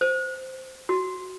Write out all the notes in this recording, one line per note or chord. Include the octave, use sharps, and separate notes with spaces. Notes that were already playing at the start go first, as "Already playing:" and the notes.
C5
F#4